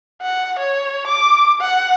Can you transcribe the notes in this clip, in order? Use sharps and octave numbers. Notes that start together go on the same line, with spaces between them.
F#5
C#5
D6
F#5